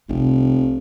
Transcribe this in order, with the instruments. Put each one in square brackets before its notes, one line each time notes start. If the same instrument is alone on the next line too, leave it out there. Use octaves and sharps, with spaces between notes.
[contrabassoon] F1 [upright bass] C2